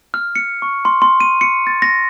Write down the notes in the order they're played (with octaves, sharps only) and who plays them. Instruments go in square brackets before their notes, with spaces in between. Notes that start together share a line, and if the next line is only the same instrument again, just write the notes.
[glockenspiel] F6
C#7
C#6
C6
C6
D#7
C#7
A6
A#6